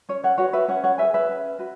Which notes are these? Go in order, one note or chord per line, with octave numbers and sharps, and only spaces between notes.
C#4 C#5
C#5 F#5
F#4 B4 C#5 F#5
B4 E5
C#4 C#5 F#5
C#5 F#5
G#4 B4 E5 G#5
B4 E5
C#4
F#4 B4